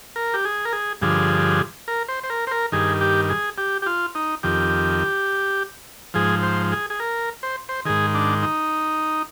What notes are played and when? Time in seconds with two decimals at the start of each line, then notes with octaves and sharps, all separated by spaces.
0.16 A#4
0.34 G4
0.45 G#4
0.65 A#4
0.73 G#4
1.02 G2 D3 F3 G#4
1.88 A#4
2.08 C5
2.23 C5
2.30 A#4
2.47 C5
2.51 A#4
2.72 G2 D#3 G#4
3.01 G4
3.30 G#4
3.58 G4
3.82 G4
3.86 F4
4.15 D#4
4.43 F2 D#3 G4
6.14 G#2 F3 G#4
6.43 C5
6.72 G#4
6.90 G#4
7.00 A#4
7.43 C5
7.69 C5
7.85 G#2 D#3 G#4
8.14 D4
8.43 D#4